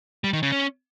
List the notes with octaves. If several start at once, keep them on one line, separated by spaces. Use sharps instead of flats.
G3
D#3
C#3
C#4